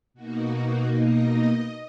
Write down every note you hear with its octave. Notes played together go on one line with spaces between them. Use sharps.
B2 A#3 D#4 F#4
D#5